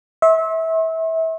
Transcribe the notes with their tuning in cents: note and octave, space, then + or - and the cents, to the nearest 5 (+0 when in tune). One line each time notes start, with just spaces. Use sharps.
E5 -25 C6 +40